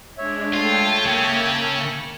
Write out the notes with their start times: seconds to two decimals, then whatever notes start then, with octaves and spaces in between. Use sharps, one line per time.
0.18 G#3 D4 C#5 E5
0.54 G#3 A3 F4 G5 A5
1.05 C#3 A#3 C#4